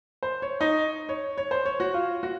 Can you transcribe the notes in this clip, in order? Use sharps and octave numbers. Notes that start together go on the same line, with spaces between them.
C5
C#5
D#4
C#5
C#5
C5
C#5
F#4
F4
F#4